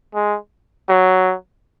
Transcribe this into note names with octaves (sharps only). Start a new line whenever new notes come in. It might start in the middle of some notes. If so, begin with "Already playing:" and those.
G#3
F#3